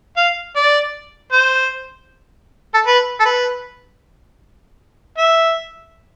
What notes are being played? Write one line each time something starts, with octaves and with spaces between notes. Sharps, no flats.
F5
D5
C5
A4
B4
A4
B4
E5